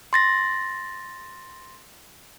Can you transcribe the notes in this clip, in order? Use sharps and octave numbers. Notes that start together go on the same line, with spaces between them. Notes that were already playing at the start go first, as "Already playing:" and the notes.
C6 A6 A#6